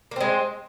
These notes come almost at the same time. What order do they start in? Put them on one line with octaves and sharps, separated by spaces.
A#3 C4 G#3